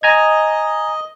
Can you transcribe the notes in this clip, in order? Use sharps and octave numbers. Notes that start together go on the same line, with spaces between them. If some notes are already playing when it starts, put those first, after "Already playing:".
D#5 G#5 A#5 G#6